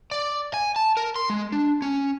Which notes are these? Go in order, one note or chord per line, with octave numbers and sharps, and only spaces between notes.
D5
G#5
A5
A#4
C6
G#3
D4
C#4